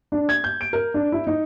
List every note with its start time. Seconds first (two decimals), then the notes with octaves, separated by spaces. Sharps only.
0.12 D4
0.29 G#6
0.44 G6
0.61 D7
0.73 A#4
0.94 D4
1.12 E4
1.27 D#4